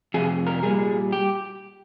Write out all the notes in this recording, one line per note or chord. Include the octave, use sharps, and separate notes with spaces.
F2 C3 G#4
A#4
A#2 G3 G#4
G4